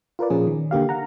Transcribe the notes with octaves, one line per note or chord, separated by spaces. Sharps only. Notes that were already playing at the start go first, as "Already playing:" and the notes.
F4 A#4 B4 D5
A#2 F3 C#4 G#4
D#3
D3 A#3 G4 F5
F#5 A#5